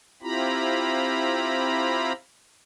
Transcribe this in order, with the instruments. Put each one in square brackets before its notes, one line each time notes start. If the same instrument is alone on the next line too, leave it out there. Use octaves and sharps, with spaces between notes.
[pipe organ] C4 E4 F4 G4 A#5 B5